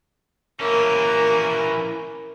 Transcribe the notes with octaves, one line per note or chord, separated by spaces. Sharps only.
E3 A#3 C#4 A#4